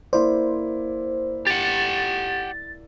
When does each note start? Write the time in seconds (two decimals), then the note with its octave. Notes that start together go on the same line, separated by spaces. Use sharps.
0.13 A#3 E4 C5 D5
1.47 G4 F#5 A6